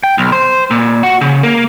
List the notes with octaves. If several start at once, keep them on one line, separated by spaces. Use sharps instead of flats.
G5
B1
C5
A#2
F#4
C#3
A#3